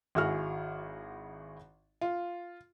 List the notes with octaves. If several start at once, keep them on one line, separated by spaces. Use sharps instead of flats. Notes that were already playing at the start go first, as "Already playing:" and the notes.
G#1 E4 F#4 G#4 F6
F4